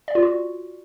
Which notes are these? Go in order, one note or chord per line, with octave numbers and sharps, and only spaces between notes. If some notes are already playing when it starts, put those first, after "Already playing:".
D5
F4
F#4